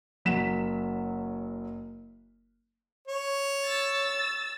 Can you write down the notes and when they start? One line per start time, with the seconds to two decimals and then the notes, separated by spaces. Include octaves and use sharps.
0.25 F#1 F#3 B6 E7
3.08 C#5
3.64 E6 A6